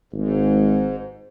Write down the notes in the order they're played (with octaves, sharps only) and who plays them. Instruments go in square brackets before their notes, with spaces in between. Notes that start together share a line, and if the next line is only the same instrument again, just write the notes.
[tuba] G#1 [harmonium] G#2